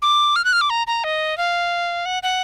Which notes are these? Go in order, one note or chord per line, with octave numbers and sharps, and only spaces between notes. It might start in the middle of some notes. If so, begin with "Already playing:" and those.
D6
F6
F#6
F6
D6
A#5
A#5
D#5
F5
F#5
F#5